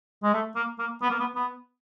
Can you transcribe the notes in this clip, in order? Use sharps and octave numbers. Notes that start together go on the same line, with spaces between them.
G#3
A3
A#3
A#3
B3
A#3
B3
B3